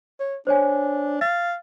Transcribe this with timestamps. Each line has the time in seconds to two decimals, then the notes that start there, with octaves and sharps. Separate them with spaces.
0.20 C#5
0.47 D4 C5 C#5 G#5
1.21 F5 A6